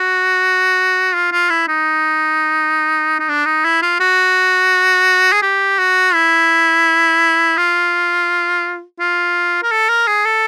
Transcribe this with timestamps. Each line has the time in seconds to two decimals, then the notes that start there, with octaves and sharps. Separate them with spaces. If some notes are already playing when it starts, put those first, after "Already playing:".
Already playing: F#4
1.14 F4
1.32 F4
1.50 E4
1.68 D#4
3.19 D#4
3.29 D4
3.46 D#4
3.65 E4
3.82 F4
4.00 F#4
5.32 G#4
5.42 G4
5.79 F#4
6.14 E4
7.57 F4
9.00 F4
9.63 A#4
9.71 A4
9.89 A#4
10.07 G#4
10.25 A4